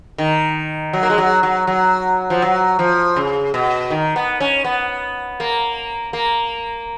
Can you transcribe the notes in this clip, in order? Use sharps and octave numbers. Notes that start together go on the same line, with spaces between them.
D#3
F#3
A#3
G#3
F#3
F#3
F#3
F3
F#3
F3
C#3
B2
D#3
B3
C#4
B3
A#3
A#3